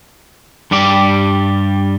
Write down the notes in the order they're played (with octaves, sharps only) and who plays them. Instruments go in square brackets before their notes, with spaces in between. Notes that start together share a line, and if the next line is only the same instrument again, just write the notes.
[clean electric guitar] G2 G3 G4 D5